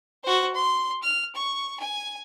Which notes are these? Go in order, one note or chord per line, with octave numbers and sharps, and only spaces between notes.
F#4 C5
C6
F6
C#6
G#5